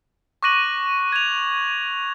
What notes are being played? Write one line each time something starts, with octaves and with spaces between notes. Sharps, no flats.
C#6 D6 F#6 A#6 D#7 F#7
G#6 F7